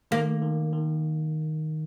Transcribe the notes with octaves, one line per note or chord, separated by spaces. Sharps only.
D#3 A#3
D#3
D#3